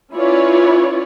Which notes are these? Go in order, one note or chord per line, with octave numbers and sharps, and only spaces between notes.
C#4 E4 F4 B4 C#5 D5